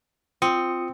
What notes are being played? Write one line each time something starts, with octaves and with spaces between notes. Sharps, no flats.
C4 F4 D#6 C#7